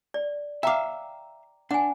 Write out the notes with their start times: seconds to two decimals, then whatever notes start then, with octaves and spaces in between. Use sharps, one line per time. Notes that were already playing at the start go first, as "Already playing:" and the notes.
0.14 D5
0.63 E5 F5 G5 A#5 D6
1.71 D4 F#5 G#5